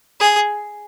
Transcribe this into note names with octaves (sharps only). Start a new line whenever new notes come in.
G#4